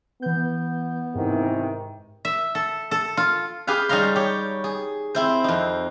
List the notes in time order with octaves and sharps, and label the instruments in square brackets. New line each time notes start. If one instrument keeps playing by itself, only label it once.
[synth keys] E3 G6 [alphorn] B3
[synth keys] G#2 [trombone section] C3 D#3 E3
[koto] E5
A4
A4
F4
[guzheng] G4 G#4 B4 F5
G3 D#4 C#5 F5 A#5 C6
G4 C#5
G#4
C4 E4 C5
F2 D#4